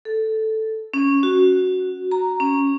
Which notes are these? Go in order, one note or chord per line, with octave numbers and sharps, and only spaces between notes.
A4
C#4
F#4
A#5
C#4